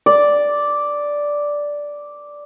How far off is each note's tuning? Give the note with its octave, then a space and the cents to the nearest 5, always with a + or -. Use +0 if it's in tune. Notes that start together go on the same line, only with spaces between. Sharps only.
D5 -5